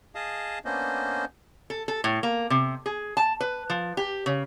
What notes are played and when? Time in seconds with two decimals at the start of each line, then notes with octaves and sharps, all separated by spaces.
0.15 G#4 D#5 F5 A5 D#6
0.65 A#3 B3 C#4 D4 C5 D#5
1.70 A4
1.88 A4
2.04 A2
2.23 A#3
2.50 C3
2.86 G#4
3.17 A5
3.41 B4
3.70 F3
3.97 G4
4.26 C#3